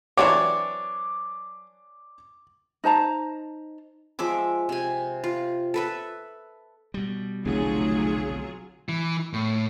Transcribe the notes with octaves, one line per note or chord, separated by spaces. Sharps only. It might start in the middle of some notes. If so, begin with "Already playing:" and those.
E3 F#3 C4 D4 E4 C#5 D6
D#4 C5 A5 A#5
F3 G#3 E5 D6
C3 G#5
F4
A4 B4 E5
B2 G3
F1 B1 D3 F#3 A3 F4 G#4
E3
A2